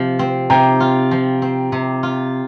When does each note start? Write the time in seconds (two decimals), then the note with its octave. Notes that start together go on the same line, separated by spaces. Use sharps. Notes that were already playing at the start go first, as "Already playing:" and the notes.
Already playing: C3 F3
0.19 C4
0.50 C3 G5 A#5
0.80 F4
1.11 F3
1.42 C4
1.72 C3
2.03 F4